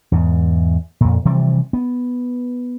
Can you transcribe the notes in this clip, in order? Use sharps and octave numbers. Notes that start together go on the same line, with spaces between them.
E2 G#2
F2 A#2
C3 E3 F3 G3
B3